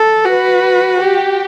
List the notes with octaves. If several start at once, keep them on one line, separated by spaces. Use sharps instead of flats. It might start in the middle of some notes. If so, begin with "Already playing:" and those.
Already playing: A4
F#4 B4
G4